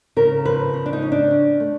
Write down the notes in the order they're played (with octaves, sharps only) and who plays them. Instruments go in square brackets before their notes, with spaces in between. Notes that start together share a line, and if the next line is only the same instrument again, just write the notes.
[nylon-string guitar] C#3 A#4
F3 B4
C#3
D4
D#4
C#4
D4
C#4
A3